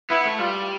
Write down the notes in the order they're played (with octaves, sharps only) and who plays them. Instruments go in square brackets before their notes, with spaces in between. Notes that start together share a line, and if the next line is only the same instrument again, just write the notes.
[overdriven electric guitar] B3 [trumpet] E4
[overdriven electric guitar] A3
[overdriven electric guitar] G3 [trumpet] F4